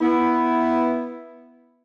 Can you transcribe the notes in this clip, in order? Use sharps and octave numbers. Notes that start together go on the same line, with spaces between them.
B3 E4